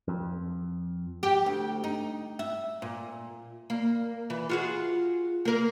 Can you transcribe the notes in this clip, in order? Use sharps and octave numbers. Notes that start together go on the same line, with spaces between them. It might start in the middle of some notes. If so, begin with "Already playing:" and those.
F2
G4
D2
D#4
E5
A#2
A#3
E3
F4 F#4 G#4
A#3 A#4